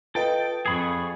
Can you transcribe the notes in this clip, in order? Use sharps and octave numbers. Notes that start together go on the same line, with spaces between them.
F4 A4 B4 D#5 G5
F2 G#4 B5 C#6 A6